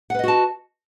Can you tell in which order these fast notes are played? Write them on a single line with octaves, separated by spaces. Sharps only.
F#5 B4 D#5 F#4 A5